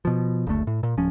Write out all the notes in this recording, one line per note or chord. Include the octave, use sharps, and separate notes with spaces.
B2 F3
F#1 D2 A3
A2
A#2
D1 F3 C#4